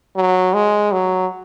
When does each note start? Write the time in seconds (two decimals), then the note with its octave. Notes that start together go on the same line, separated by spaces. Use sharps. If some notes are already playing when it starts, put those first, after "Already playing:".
0.16 F#3
0.54 G#3
0.92 F#3